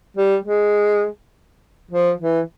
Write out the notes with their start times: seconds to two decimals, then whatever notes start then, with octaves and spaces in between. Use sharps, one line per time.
0.17 G3
0.46 G#3
1.91 F3
2.20 E3